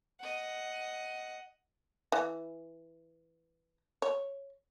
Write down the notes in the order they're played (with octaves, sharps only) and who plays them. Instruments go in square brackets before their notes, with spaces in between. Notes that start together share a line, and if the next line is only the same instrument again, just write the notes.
[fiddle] D#5 F#5
[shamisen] E3
C#5